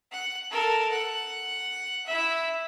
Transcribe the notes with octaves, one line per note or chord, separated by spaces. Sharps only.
F#5
A4 A#4
F#5
E4 E5